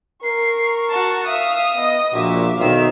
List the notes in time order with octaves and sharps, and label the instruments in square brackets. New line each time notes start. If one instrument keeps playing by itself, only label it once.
[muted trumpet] A#4 [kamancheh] C#6 [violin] C7
[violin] F#4 A5
[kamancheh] E5 F5 [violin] D#6
[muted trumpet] B3 [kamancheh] D#5
[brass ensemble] A#1 A#2 [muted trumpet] F#4 [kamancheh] E5 D6
[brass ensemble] B1 D#3 [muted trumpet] C5 [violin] E5 E6 [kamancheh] F5